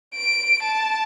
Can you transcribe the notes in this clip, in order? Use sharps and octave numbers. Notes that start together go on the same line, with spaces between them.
D7
A5